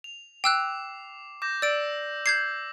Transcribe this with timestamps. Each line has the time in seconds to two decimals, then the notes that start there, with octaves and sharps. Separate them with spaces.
0.04 F7
0.44 G5 D6 E6 F#6 C7
1.42 D6 G6 A#6
1.62 D5 E6 D7
2.26 D6 G6 G#6 C7